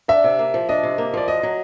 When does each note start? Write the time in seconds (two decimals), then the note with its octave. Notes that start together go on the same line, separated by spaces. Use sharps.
0.08 D4 E5
0.24 C3
0.39 A#3
0.54 F3
0.69 D4 D#5
0.83 C3
0.98 A#3
1.14 F3 D5
1.28 F#4 D#5
1.43 F#3